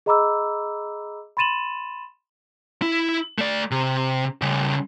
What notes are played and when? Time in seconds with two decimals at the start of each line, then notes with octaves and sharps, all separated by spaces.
0.06 G#4 D#5 A#5 B5 D6 E6
1.37 B5 C6 A6 D#7 E7 F#7
2.82 E4
3.38 A3 D5
3.71 C3
4.42 C#3 G3